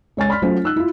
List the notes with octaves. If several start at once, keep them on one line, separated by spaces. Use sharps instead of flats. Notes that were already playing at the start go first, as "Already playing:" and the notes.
C#2 C#5 G#5 A6
D5 B5 C6 F6 B6
F#3 A3 C#4 F4 C5
D#4 E6 F#6
E4 F4